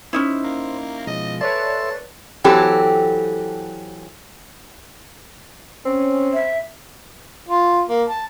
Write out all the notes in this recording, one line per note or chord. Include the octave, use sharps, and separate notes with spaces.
C#4 D#4 E4 C5
A#3
B2 F3 G#3 D#5
A4 B4 C#5 D5 E5 A5 C6
E3 F#3 C4 G4 A4
C4 C#4
E5
F4
A#3
A5